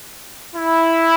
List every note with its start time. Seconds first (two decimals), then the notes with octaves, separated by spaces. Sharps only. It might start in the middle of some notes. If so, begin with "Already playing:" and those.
0.55 E4